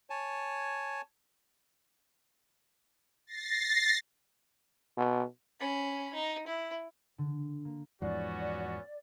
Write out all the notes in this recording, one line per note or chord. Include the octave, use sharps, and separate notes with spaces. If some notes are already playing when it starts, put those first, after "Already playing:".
C#5 G#5 A5
A6 A#6 C7
B2
C#4 B5
D#4
E4
D3
A#3
E2 G#2 F3 B3 C#4 F#4 D5